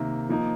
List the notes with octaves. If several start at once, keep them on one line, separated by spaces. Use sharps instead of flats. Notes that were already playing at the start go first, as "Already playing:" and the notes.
Already playing: C3 D#3 A#3
F3 A#3 D#4